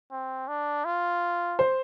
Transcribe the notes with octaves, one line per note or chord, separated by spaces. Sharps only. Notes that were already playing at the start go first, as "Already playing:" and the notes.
C4
D4
F4
C5